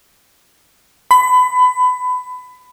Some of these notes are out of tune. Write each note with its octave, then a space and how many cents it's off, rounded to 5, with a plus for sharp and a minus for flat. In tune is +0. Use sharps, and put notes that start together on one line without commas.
B5 +25